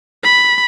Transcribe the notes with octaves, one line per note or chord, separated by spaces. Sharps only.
B5